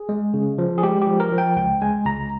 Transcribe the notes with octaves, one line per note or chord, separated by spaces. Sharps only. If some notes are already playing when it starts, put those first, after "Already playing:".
Already playing: G#4
G#3
C#3
F3
G#4
G#3 G4
G4
F3
A#4
F3
G5
C#2 G5
G#3 G#5
C#2 A#5